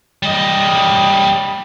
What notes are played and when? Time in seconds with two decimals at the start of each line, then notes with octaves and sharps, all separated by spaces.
0.23 G3 D#5